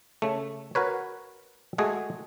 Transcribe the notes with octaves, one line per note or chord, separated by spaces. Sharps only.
C#3 A3
F#4 A#4 B4 C#5
G#3 A3 F#4 G#4